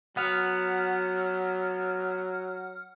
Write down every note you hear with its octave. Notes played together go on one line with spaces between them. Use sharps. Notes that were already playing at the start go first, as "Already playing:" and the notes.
F#3 B3 F#5 F6